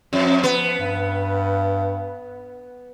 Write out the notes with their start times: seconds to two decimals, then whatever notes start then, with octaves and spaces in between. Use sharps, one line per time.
0.13 F2 F3
0.44 B3
0.79 G2